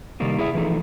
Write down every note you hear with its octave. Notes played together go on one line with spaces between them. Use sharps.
C3 D#3 G3 A#3 D#4
E4 G#4 E5
E3 F3 A3 D#4